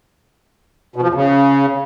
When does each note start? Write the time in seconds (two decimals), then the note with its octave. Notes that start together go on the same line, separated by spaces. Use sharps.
0.96 B2
1.02 F3
1.08 E2
1.14 C#3